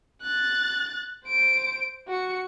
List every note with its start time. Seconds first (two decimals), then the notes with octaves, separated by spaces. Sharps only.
0.23 F#6 A6
1.25 C5 D7
2.08 F#4 C#7